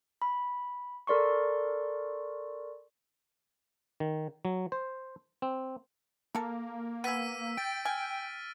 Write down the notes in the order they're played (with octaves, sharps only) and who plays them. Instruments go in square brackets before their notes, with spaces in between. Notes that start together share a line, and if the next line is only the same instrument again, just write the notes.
[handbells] B5
A4 A#4 D5 C6 C#6
[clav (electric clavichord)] D#3
F#3
C5
C4
[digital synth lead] A#3 [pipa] A4 A#4
[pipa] B3 G#4 [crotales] E6 B6 D#7
[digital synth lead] G5 [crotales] A6 D7
[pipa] G#5 [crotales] F6